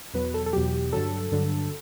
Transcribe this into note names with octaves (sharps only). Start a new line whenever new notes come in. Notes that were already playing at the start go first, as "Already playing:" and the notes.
E2 B2 F#3 B4
A4
A4
E2 B2 F#3 G4
G2 D3 F#3 A4
G2 D3 F#3